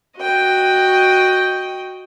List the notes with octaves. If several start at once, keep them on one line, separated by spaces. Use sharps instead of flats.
F#4 D#5 G5